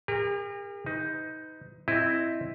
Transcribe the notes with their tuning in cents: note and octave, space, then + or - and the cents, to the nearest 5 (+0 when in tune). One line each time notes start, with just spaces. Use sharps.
G4 +45 A#4 -15
D#4 +15 B4 +40
C4 +0 E4 +0 D#5 -15